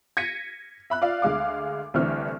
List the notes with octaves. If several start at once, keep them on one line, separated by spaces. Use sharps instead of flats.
G#6 A#6 B6 C#7 D#7
E5 B5 F#6
F4 D5 E5 F5
D2 G#3 F5 D6
C2 D3 E3 A3 C4 F6